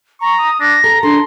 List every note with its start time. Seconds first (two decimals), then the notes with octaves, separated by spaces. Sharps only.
0.21 A#5 C#6
0.39 D#6
0.60 D4 A#6
0.84 A4 A#5
1.03 D4 A4 C6